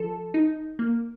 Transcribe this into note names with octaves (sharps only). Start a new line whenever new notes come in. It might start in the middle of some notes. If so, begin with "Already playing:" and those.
Already playing: F3 A4
D#4
A#3